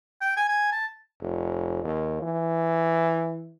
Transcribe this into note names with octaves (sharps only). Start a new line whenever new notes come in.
G5
G#5
G#5
A5
F1
D#2
E3